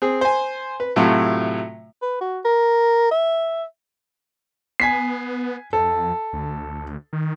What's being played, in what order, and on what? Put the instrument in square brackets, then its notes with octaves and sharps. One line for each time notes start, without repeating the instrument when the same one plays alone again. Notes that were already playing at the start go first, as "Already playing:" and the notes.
[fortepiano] C4 G#4
C5 G#5
B4
A2 C3 F#3 A3 F4
[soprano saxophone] B4
F#4
A#4
E5
[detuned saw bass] B3 [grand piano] G#5 B6 C7
[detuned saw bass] F2 [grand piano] A4
[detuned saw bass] D2
D#3